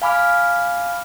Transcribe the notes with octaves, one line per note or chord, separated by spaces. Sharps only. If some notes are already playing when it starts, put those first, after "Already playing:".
F5 G#5 B5 D6 F6